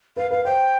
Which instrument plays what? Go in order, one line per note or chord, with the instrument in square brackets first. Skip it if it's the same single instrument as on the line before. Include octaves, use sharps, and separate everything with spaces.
[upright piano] B4 [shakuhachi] F5
[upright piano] B4 [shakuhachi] F5
[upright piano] C5 [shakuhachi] G5